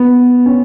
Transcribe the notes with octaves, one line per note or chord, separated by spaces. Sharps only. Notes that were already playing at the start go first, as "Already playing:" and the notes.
Already playing: B3
C#4